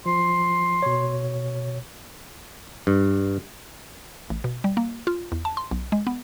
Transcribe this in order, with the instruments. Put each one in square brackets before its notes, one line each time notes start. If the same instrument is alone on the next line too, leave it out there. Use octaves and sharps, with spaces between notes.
[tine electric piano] F3 [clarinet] C6
[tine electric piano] B2 C#5
[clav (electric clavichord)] G2
[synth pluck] A1
B2
G3
A#3
F4
E2
A5
C6
B1
G#3
B3